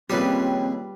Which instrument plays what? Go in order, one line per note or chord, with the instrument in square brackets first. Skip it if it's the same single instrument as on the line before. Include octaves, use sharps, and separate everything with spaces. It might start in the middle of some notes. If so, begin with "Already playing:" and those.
[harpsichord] D#2 G#4 D#6 [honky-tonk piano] F3 C#4 [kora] G3 B4 [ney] C4